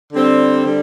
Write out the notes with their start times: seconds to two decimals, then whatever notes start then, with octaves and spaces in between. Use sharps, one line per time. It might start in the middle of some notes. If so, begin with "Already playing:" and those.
0.13 D3 G3 C4
0.65 D3 G3